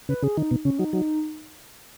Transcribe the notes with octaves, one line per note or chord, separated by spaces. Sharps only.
C#3 B4
C#3 G#4
D#3 D#4
B2
C#3 C#4
F#3 D#4
F#3 D#4